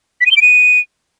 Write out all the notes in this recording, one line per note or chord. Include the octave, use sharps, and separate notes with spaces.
B6
D#7
G7
D7
D#7